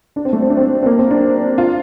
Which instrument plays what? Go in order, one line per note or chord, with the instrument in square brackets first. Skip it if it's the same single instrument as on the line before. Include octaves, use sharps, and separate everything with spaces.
[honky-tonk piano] D4
C4
A3
C4
D4
C4
C4
A#3
C4
D4
F4